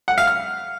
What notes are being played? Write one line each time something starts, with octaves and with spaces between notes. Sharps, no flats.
F#5
F5
F6